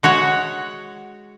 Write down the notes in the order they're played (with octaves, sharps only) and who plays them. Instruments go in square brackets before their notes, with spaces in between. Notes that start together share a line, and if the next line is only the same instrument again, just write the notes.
[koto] G#3 F#4 C#5 F#5